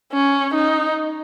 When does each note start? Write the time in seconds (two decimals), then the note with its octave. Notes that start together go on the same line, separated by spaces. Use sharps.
0.13 C#4
0.54 D#4